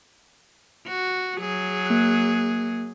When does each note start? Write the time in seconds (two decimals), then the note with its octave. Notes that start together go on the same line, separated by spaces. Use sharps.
0.88 F#4
1.37 F#3 G#4
1.86 A#3 F#6